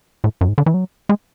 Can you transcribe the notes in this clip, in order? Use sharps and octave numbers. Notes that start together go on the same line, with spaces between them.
A2
F#2
G#2
D3
E3
F#3
G#3